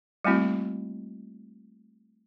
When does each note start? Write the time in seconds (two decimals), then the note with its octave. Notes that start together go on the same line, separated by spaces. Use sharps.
0.25 G3 A3 A#3 C4 E4 F#4